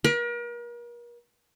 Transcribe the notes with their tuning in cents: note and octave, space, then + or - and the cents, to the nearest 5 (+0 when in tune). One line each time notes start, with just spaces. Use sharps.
A#4 +40